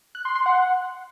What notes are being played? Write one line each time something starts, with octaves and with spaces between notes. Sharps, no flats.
F#6
C6
C6
F#5